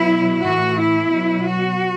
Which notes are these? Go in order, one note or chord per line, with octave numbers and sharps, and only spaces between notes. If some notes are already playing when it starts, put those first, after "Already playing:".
Already playing: B2 F#3 E4
A2 E3 F#4
E4
B2 F#3
F#4